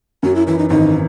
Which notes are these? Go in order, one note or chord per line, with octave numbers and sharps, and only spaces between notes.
F#2 F#4
E4
E3 E4
D#4
G#1 D#4